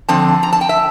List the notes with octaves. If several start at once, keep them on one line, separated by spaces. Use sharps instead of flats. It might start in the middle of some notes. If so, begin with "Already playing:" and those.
D3 F3 C4 A5
A#5
A5
G5
E5